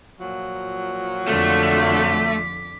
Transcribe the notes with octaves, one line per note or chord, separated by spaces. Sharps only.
A#2 F3 F#3
F2 D3 A3 F4 D6 B6